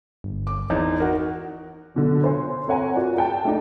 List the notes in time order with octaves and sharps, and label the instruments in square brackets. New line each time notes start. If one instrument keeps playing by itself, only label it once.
[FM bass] G1
[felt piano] D6
[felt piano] E2 [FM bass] D#4
[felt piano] F#4 A#4
[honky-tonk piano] F#1 B2 D3
C5 C#5 G#5 C6
C4 A4 C#5 F#5 G#5 A#5
F4 F#4 A#4 D5
G#4 G5 A5
A3 D4 D#4